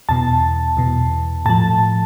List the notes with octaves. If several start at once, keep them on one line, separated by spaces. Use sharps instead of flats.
E2 B2 A5
E2 B2
A2 F3 A5